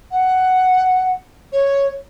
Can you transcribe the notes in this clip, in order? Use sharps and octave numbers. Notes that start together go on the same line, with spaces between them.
F#5
C#5